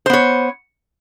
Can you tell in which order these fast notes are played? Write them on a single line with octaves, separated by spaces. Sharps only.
C5 B3 C#5